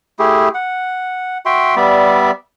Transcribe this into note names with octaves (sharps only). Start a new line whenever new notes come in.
A3 E4 G4 G#4
F#5
F#4 E5 G5 C6
G3 B3 D5 E5